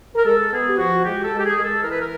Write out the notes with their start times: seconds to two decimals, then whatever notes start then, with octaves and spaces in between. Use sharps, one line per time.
0.15 A#4
0.25 G#3 A4
0.51 B3 G#4
0.68 G4
0.77 F3 F#4
1.03 G#3 G4
1.23 A4
1.31 G#3
1.37 G4
1.44 G#4
1.56 G#3 A#4
1.63 A4
1.82 E3 A#4
1.91 B4
1.99 A#4